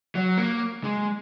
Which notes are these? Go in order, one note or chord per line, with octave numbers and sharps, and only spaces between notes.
F#3
A#3
G#3